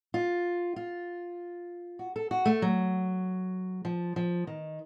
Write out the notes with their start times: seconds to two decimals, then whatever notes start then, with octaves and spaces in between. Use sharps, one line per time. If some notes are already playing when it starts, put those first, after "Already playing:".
0.14 F4
0.76 F4
1.99 F#4
2.16 A4
2.31 F#4
2.46 A3
2.62 F#3
3.85 F3
4.16 F3
4.47 D#3